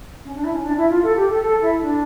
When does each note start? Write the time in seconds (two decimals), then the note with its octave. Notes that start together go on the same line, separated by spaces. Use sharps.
0.24 C#4
0.35 D4
0.44 E4
0.54 C#4
0.64 D4
0.77 E4
0.90 F4
1.03 A4
1.16 G4
1.29 A4
1.42 A4
1.61 E4
1.81 D4